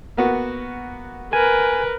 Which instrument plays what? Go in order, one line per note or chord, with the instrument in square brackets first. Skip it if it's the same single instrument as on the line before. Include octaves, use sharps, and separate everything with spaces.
[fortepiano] A#3 B3 F#4
[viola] A#4 B4 [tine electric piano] G#5